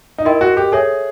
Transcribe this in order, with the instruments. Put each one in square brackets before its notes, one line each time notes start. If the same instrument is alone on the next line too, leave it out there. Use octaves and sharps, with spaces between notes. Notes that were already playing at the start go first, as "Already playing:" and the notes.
[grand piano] D#4
[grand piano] E4 [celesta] A#4 D#5 G5 C6
[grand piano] F#4
G4
[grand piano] G#4 [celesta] A4 C#5 E5